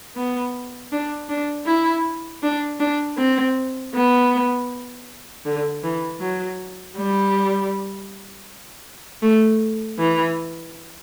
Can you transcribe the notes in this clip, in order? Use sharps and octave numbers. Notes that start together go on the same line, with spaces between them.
B3
D4
D4
E4
D4
D4
C4
B3
D3
E3
F#3
G3
A3
E3